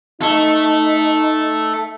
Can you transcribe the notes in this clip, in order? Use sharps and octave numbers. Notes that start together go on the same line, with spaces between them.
D#4 A4 E5